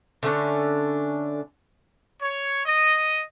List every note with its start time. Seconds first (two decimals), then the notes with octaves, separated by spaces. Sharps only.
0.23 D3 A3 C#4 D4
2.22 C#5
2.66 D#5